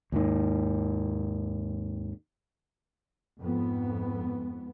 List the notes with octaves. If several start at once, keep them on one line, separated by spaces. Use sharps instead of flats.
D#2 G#2 D#3
F2 G#2 B3